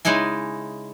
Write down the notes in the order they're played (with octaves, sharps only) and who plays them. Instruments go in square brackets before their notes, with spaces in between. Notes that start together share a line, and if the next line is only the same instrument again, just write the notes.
[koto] C#3 G#3 D#4 E4 G#5